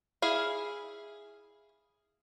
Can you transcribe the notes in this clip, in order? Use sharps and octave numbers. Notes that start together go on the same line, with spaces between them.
E4 G#4 F5